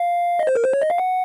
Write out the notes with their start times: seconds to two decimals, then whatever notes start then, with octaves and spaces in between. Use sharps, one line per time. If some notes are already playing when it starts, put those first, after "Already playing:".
Already playing: F5
0.39 D#5
0.47 C5
0.55 A#4
0.64 C5
0.74 C#5
0.82 D#5
0.90 F5
0.98 F#5